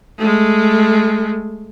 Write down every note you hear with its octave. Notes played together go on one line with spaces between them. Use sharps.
G#3 A3